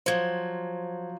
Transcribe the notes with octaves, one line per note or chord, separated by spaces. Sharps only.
F3 F#3 C5 G#6